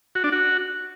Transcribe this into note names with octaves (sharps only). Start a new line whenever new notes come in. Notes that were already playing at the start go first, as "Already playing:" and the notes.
F#4
D4
F#4